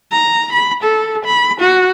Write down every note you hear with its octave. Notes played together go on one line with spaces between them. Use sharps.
A#5
B5
A4
B5
F#4